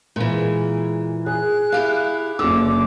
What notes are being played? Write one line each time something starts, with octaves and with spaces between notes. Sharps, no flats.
A#2 E3 G#3
G#4 F#6
E4 G4 F5
F#1 D3 D6 E6